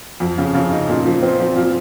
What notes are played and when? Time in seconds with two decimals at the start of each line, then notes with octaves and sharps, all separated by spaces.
0.20 F2
0.38 C#3
0.54 C#3
0.71 D#4
0.89 A#2
1.05 F3
1.22 C4
1.40 F3
1.56 F3